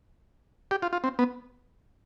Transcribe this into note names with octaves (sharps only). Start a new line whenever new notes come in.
G4
F4
F4
C4
B3